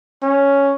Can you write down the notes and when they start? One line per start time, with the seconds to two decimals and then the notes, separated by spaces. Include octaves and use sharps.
0.23 C#4